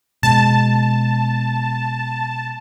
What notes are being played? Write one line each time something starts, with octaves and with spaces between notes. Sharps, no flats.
B2 G#3 A5